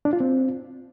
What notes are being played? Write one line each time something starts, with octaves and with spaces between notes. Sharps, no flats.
D4
F4
C4